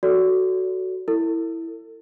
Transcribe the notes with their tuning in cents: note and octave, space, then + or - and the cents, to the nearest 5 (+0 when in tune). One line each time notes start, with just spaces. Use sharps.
F#4 +10 A4 +0 D5 -45
E4 +0 A4 +40